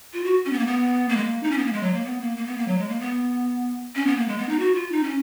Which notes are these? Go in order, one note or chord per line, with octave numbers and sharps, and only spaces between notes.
F4
F#4
C#4
B3
A#3
B3
A#3
G#3
A#3
D#4
C#4
B3
A#3
G#3
F#3
A#3
B3
A#3
A#3
B3
A#3
F#3
G#3
A#3
B3
C#4
B3
A#3
G#3
B3
D#4
F#4
F4
D#4
C#4